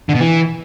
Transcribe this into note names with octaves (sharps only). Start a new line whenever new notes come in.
D3
B2
E3